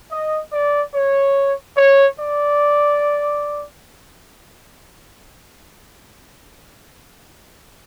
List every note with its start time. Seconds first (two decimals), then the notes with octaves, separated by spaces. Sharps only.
0.10 D#5
0.52 D5
0.93 C#5
1.76 C#5
2.18 D5